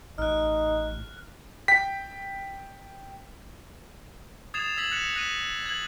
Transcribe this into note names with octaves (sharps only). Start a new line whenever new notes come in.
A1 D#4 F6 F#6
G5 B6
D#6 G#6 A6 C7 E7 F7
E6 G#6 B6 E7 F#7
F#6 A#6 B6 C#7 F7
F#6 A#6 B6 D#7
G#6 F#7